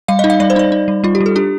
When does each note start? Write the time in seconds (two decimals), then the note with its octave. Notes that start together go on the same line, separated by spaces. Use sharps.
0.08 G3 F5
0.19 D#4 D#5
0.30 F5
0.40 G3 D5
0.50 C5
0.56 D#4 D5
0.72 D#4
0.88 G3
1.04 G3 F4
1.15 G4
1.21 G3
1.26 A4
1.36 D4 G4